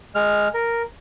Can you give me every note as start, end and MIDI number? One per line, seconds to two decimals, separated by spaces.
0.15 0.48 56
0.15 0.48 89
0.54 0.83 70